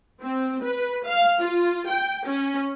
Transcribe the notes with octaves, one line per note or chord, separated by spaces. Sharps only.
C4
B4
F5
F4
G5
C#4